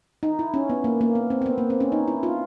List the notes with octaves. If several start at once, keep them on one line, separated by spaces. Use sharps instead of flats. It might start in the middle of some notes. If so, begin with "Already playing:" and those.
D#4
E4
C#4
B3
A#3
A#3
B3
C4
C4
B3
A#3
C4
C#4
D#4
E4
F4